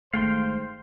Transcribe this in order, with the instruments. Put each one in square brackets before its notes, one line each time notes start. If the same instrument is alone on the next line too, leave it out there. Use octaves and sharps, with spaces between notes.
[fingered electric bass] G#1 D#3 G#3 [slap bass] A3 [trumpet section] C5 [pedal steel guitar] F5 G5 C6